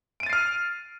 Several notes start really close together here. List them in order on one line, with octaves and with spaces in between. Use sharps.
D7 D#7 A6 C7 F6